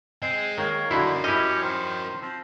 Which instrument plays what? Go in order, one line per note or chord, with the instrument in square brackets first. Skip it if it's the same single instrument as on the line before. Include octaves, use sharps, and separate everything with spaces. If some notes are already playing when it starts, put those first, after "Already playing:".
[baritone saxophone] C4 [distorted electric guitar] G#4 D#5
[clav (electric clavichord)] D#3 [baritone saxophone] A#3 [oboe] C#5
[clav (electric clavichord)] D3 D#4 E4 [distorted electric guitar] F#4 A#4 [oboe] C6
[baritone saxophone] C#4 [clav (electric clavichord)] E4 D#5 [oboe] G4
[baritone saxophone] D#3 [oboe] C5
[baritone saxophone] F3 [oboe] C4